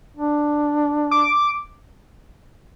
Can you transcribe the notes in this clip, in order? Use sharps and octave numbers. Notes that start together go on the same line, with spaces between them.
D4
D6